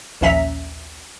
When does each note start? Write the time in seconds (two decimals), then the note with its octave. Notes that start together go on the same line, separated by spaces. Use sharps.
0.21 A#1 D#2 C#4 E5 A#5 B6